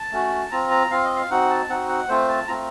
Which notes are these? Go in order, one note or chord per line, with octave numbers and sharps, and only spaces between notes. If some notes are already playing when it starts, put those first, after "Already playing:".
Already playing: A5
A3 C#4 F#4
C4 F4 A#5
A#5
C4 F4 F5
D#5
F5
C4 D#4 F#4 F#5
A5
C4 D#4 F#4 F#5
F#5
A3 C4 F4 C5
A5
A3 C4 F4 A#5